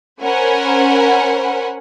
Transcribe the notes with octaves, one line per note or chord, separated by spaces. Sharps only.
C#4 A#4 C5 F#5 G#5 B5